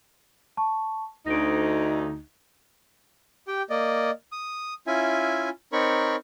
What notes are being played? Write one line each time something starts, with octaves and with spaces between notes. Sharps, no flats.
A5 C#6
D2 D#4 A#6 D7
G4 G5
A#3 D5 D#5
D#6
C#4 E4 F4 E5 G#5
C4 D#4 A#4 C#5 B5 C#6